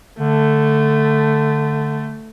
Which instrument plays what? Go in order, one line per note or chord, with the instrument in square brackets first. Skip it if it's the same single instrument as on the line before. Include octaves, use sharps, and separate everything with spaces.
[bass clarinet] D3 [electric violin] A3